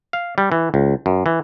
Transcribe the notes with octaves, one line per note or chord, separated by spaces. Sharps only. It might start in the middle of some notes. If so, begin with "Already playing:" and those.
F5
G3
E3
C#2
F#2
E3